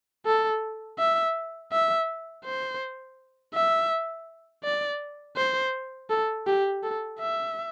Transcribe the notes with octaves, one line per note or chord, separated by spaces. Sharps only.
A4
E5
E5
C5
E5
D5
C5
A4
G4
A4
E5